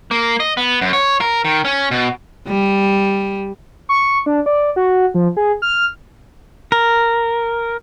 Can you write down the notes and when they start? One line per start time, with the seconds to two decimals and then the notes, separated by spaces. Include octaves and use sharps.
0.11 A#3
0.40 D#5
0.57 B3
0.81 F#2
0.93 C#5
1.21 A#4
1.45 D#3
1.65 C#4
1.91 B2
2.47 G3
3.89 C#6
4.26 D4
4.46 D5
4.76 F#4
5.14 F3
5.37 G#4
5.62 F6
6.72 A#4